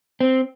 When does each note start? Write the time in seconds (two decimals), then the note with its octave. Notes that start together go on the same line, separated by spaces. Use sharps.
0.21 C4